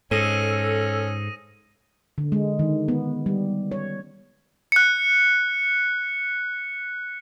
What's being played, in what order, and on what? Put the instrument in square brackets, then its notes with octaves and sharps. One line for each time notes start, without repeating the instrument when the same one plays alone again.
[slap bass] G#2 [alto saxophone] C#4 [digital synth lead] A4 [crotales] D#6 A#6 D#7
[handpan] D3
G#3
D#3
B3
G3
C#5
[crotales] F#6 C#7